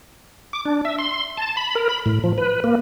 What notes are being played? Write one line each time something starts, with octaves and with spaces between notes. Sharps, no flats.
D6
D4
E5
C6
A5
B5
A#4
B5
A2
F3
B4
A#3